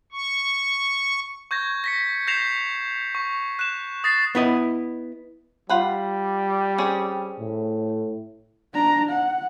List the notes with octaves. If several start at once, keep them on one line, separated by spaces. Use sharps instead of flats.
C#6
C#6 G6 G#6 A#6
A#6 B6 C#7
G6 A#6 C7 E7 F7
C#6
F#6 E7
D#6 A6 A#6 C7
B3 E4 D#5
G3 F4 F#5 B5
C4 C#4 G#4
A2
D4 A#5
F#5